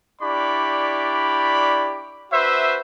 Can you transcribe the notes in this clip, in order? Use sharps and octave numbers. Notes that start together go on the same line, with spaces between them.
D4 E4 G4 D5 B5 C#6
D4 F#4 B4 C5 E5